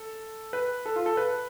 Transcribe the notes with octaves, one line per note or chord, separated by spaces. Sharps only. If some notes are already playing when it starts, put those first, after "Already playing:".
Already playing: A4
B4
A4
F4
A4
B4